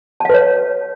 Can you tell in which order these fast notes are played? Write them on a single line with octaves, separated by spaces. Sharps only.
A5 F5 B4 C#5